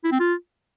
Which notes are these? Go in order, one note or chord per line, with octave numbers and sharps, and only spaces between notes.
E4
C4
F4